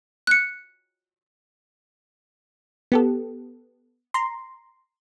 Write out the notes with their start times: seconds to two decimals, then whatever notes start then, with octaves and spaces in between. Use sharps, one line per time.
0.27 F#6 C#7
2.92 B3 G4 A4
4.14 A#5 C6